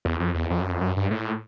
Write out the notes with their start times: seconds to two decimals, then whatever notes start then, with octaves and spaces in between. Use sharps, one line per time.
0.05 E2
0.20 F2
0.35 E2
0.50 F2
0.61 F#2
0.70 F2
0.81 F#2
0.96 G2
1.11 A2